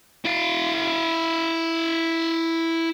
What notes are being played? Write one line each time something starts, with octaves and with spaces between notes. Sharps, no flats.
E4 F5